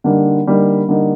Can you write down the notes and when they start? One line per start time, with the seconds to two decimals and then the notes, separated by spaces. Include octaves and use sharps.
0.04 D3 G3 A#3 D#4
0.47 D3 G3 A#3 D#4
0.88 D3 G3 A#3 D#4